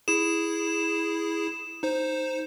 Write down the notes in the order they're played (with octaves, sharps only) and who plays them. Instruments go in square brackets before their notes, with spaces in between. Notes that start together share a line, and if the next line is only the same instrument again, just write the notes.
[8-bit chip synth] E4 G#4 [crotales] E7
[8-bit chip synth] D#4 C5